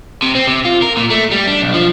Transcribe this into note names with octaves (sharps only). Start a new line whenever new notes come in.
C3
C4
C3
F4
A#4
A#2
A3
G3
D4
B1
F3